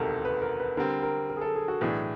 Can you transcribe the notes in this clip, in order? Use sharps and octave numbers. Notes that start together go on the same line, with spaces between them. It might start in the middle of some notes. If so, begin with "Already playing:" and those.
Already playing: E1 D2 C3 D#3 A4 A#4
B4
A#4
B4
D3 G3 C4 A#4
A#4
A#4
G#4
A4
G#4
F#4
B1 A2 E3 A3 D4 G#4